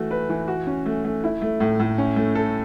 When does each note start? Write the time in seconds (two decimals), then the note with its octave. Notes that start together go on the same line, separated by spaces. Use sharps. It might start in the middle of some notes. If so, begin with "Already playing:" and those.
Already playing: E3 A3 F#4
0.11 B4
0.29 E3
0.48 F#4
0.67 C#4
0.86 A3
1.04 A3
1.24 E4
1.42 A3
1.60 A2
1.80 A2
1.98 C#4
2.16 A3
2.35 A4